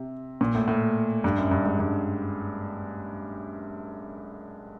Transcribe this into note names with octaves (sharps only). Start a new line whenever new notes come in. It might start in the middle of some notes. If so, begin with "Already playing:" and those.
Already playing: C3
A#2
A2
A2
G2
F#2
G2
G#2
G2